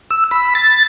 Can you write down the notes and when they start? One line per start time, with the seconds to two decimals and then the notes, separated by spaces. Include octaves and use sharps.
0.10 E6
0.31 B5
0.55 A6